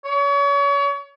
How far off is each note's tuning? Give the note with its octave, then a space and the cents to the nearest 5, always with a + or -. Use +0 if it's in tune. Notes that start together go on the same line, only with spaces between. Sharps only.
C#5 +35